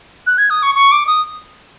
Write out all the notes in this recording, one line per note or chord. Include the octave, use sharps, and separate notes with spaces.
F#6
G#6
D#6
C#6
C#6
D6
D#6